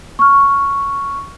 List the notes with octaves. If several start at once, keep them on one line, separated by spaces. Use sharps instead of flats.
C#6 F6